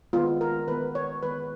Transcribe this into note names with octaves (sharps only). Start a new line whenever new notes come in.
D#3 G#3 B3 F4
A#4
D#3 G#3 B3 B4
C#5
D#3 G#3 B3 B4